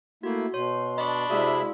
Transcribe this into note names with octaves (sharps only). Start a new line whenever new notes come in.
A3 A#3 E4 F#4
B2 C#5 C6
D4 D#5 B5 C#6
C3 G#3 E4 F#4 G#4 D5 E5 F5